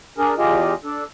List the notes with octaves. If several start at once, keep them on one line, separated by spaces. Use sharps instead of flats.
D4 G#4 A#4
E2 F4 G4 G#4 D#5
D4 A4